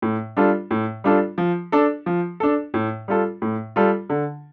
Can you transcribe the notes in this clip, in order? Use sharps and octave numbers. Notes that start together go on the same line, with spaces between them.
A2
G3 D4 F4 A4
A2
G3 D4 F4 A4
F3
D4 A4
F3
D4 A4
A2
G3 F4 A4
A2
G3 F4 A4
D3